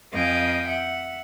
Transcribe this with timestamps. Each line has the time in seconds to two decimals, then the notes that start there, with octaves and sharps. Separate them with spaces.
0.13 F2 D#5 F5 G5 G#5 D#6
0.68 E5 F#5